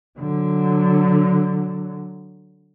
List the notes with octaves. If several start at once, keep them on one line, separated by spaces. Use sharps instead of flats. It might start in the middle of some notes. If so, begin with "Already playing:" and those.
D3 F#3